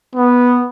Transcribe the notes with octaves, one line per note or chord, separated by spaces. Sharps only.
B3